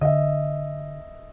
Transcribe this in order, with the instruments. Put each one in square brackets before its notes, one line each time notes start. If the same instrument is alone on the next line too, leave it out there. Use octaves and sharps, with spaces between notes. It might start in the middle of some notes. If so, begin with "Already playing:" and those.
[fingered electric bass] D3 [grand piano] D#5 E5